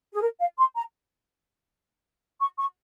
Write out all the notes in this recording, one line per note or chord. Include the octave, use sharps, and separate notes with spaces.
G#4
A#4
F5
C6
A#5
C#6
C#6